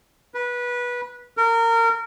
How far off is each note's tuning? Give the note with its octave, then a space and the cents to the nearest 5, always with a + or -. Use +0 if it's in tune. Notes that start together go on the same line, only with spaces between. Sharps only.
B4 -20
A#4 -25